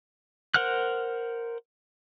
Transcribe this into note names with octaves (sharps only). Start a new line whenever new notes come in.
A#4 C5 F#5 F6 F#6